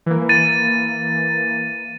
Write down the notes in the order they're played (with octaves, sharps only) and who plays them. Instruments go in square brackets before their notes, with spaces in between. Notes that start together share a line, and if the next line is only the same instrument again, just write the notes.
[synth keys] E3 A#3
[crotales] A6 D#7